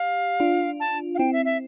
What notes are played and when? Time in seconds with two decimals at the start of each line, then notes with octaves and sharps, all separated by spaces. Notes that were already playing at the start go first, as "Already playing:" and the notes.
Already playing: G4 F5
0.40 D4 F4
0.80 A5
1.15 F5
1.19 C4 E4 G5
1.33 E5
1.45 E5